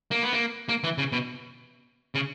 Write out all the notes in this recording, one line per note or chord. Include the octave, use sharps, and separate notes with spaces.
A#3
B3
A#3
A#3
E3
C#3
B2
C#3